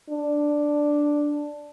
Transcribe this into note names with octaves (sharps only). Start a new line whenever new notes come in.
D4